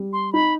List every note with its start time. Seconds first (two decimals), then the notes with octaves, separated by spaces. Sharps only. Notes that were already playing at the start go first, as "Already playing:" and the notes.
Already playing: G3
0.13 C6
0.33 D#4 B5